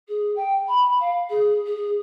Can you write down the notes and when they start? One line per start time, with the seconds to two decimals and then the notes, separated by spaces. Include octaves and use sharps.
0.08 G#4
0.36 G5
0.68 B5
1.00 F5
1.29 G#4
1.66 G#4